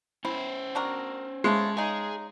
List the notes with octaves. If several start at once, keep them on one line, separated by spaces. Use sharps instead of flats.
C#4 E4 C5
D4 F#4 A#4
C#3 E3 G#3 A3
C#3 D#4 G#4